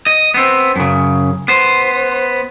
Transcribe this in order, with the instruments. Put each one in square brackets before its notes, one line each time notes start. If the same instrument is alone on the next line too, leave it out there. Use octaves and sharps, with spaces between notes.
[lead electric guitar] D#5
B3 C4
F#2 C#3
B3 C5